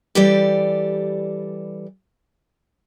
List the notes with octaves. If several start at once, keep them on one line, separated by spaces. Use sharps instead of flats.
E3 G3 G4 A4 D5